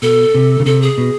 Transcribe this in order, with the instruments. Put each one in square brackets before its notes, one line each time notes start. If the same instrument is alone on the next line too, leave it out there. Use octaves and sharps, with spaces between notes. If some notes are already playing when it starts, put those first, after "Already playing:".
[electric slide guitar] B2 [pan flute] A4
[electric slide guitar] C3
C#3
[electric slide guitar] C3 [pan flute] A4
[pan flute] G#4
[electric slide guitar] B2